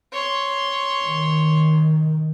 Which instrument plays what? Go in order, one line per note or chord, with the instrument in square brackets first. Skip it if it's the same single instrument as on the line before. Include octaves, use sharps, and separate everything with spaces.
[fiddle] C#5 C6
[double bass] D#3